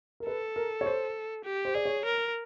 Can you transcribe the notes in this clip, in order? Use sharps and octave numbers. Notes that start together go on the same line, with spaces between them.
A#4
A4 B4
A#4
C#5
C5
G4
C5
G#4 D5
C#5
A#4